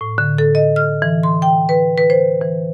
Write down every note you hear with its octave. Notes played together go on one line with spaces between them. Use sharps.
A2
D3
A4
D#5
F6
E3
C6
G5
B4
B4
C5
E3